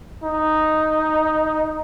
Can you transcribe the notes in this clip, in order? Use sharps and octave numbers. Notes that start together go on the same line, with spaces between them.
D#4